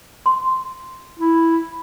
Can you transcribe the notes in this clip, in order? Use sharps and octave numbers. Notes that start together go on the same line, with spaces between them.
C6
E4